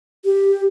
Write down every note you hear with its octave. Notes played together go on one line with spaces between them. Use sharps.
G4